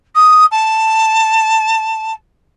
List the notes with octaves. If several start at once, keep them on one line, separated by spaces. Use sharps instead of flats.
D#6
A5